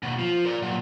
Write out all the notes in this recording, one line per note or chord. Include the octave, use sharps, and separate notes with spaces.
D#2 B2
F3
A#4 D5
A#2 F#3